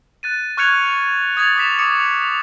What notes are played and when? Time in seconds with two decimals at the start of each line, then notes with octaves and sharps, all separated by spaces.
0.23 F#6 A6 D#7
0.57 C#6 F6 F#6 G#6 C#7 F7
0.87 F7
1.37 D#6 G#6 A6 F7
1.56 D6 D#6 A6 B6 E7
1.79 D6 D#6 C#7 E7 F7